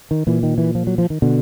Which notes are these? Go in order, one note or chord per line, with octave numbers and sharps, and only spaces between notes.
D#3
A#2 E3
D#3
E3
F3
F#3
F3
D#3
B2 D3